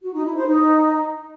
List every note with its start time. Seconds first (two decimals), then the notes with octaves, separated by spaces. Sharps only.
0.02 F#4
0.13 D#4
0.25 E4
0.36 C5
0.47 D#4